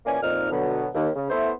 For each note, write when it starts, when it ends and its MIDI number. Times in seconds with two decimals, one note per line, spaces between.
0.06 0.18 46
0.06 0.18 52
0.06 0.18 58
0.06 0.18 61
0.06 0.18 74
0.06 0.18 80
0.22 0.47 41
0.22 0.47 46
0.22 0.47 63
0.22 0.47 89
0.51 0.87 47
0.51 0.87 50
0.51 0.87 54
0.51 0.87 59
0.94 1.09 39
1.15 1.27 49
1.30 1.51 57
1.30 1.51 59
1.30 1.51 64
1.30 1.51 72